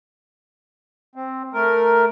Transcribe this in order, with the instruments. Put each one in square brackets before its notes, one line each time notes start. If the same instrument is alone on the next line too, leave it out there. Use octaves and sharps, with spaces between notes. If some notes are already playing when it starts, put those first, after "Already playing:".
[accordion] C4
A3 A#4